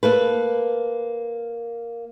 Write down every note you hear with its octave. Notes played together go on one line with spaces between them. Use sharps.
A#3 A4 B4